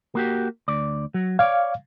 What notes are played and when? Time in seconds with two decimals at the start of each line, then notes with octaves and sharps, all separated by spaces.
0.15 A#3 F#4 G4
0.68 D2 D5
1.14 F#3
1.39 C#5 D5 F5